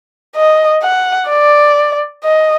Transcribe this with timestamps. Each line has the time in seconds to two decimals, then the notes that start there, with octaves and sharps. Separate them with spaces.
0.36 D#5
0.83 F#5
1.29 D5
2.24 D#5